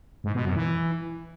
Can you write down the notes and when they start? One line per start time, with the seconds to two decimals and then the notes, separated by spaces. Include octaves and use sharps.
0.24 G#2
0.35 B2
0.45 F#2
0.56 E3